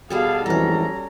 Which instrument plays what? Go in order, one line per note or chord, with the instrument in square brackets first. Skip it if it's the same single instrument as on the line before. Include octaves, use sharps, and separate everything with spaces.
[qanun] B2 G3 A4 [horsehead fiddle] G#4 F5
[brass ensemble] F2 G#2 E3 [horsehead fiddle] G3 A#5 [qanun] C#4 A4